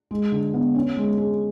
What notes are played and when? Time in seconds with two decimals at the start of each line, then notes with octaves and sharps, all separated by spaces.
0.11 G#3
0.32 D3
0.54 B3
0.75 C#4
0.97 G#3
1.18 G#4